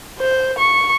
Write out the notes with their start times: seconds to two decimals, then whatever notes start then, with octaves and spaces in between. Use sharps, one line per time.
0.19 C5
0.58 C#6